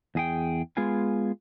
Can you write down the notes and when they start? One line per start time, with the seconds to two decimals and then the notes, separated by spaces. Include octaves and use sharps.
0.15 E2 G#4 G5
0.77 G#3 B3 F4 G#4 G#5